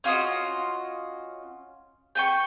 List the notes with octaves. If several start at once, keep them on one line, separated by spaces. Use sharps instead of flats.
C#4 F4 F#4 D#5
G5 G#5 C#6